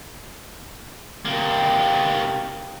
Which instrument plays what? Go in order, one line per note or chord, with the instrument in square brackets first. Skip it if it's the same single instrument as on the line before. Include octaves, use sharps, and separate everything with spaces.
[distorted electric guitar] C3 A#3